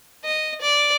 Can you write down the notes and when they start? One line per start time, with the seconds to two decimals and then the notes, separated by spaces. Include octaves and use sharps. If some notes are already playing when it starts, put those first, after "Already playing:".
0.24 D#5
0.61 D5